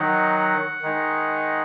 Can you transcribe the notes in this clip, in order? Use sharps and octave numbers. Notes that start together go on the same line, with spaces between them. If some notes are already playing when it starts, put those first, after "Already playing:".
Already playing: D#3 F#3 D#4 F#5
D#3 G#3 D#4